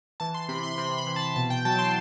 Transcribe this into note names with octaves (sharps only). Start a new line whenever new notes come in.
E3 A5
C6
C3 B5
C6
C3 B5
B5
E3
A5
B2 A5
G5
F#3 A5
C6